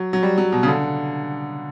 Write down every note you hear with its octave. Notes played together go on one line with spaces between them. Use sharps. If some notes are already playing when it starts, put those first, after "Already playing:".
Already playing: F#3
F#3
G3
F#3
B2
C#3
D3